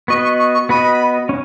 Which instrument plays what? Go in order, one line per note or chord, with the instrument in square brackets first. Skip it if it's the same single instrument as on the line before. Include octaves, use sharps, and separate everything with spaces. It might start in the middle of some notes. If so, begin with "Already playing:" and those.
[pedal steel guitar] B3 F#4 D#5 [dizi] C#6
[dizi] C#6
C#6
C#6
[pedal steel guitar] B3 F#4 D#5 [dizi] B5
[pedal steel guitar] C#4